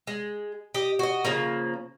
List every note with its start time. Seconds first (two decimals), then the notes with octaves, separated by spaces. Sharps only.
0.07 G#3
0.74 G4 D#5
0.99 F#4 D#5
1.25 C#3 F3 A#3